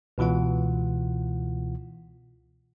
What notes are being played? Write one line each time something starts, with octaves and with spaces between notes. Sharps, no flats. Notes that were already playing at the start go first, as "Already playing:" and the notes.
C#2 B2 E3 F4 F#5